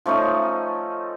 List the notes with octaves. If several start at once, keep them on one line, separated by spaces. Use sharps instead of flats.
F3 A3 C#4 D#4